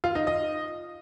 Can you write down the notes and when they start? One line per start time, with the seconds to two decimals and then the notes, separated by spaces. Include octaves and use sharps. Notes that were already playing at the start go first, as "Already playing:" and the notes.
0.04 F4
0.15 D#4
0.27 D#5